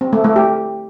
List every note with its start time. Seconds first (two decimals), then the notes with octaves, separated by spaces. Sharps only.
0.01 C4
0.13 A3
0.24 A3
0.36 G4